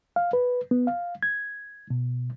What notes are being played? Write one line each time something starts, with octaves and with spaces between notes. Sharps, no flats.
F5
B4
B3
F5
G#6
B2